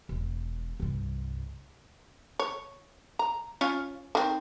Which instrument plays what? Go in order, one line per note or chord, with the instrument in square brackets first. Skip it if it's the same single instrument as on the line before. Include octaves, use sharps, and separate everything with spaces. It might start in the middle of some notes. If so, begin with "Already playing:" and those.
[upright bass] E1
C2 G2
[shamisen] C#5
A#5
C#4 F4 C#5
D#3 C4